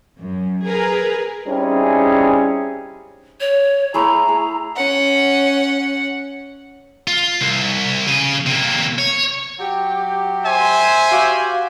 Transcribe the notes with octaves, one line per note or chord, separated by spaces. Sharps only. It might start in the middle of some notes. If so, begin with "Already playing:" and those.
F#2
G#4 A#4 B4
G3 C4 C#4 D#4 E4 G#4
C#5
A3 E4 G#4 A#5
G#4
C#4 F#5
F4
C2
C#3 G#4
C3 A#3
C#5
F#3 G4
C5 E5 G#5
F#4 G4 F5